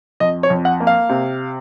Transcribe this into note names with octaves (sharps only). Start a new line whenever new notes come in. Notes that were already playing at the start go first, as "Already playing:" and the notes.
F2 D#5
C#5
F2
F#5
A#3
F5
C3